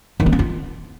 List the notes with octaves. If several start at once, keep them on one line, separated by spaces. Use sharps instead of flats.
D#3
B3
C#4
F4